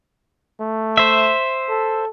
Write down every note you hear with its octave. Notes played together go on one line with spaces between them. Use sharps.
A3
C5 E5
A4